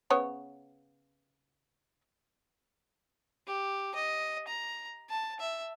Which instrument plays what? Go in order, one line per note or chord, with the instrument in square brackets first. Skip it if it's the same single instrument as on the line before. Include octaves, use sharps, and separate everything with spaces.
[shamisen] C#3 B3 C#5
[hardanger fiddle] G4
D#5
A#5
A5
E5